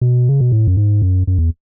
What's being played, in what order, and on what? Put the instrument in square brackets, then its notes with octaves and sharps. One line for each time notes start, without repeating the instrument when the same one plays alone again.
[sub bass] B2
C#3
B2
A2
F#2
G#2
F#2
F#2
E2